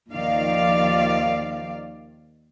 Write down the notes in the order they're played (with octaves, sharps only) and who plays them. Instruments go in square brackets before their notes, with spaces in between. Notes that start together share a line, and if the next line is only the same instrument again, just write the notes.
[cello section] D#2 D#3 F3 D5 F5